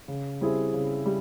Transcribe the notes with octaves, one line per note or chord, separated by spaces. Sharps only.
C#3
G3 C4 E4 G#4
C#3
G3